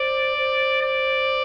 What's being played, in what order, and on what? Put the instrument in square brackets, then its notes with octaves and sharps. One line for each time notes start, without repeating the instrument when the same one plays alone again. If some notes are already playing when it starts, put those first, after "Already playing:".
Already playing: [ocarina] C5 [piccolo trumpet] D5
[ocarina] C5
[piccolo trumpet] D5